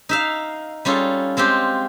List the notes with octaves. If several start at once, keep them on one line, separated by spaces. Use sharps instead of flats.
D#4 E5 F5
G3 C#4 F4 G#4 A4
G#3 C4 F4 G4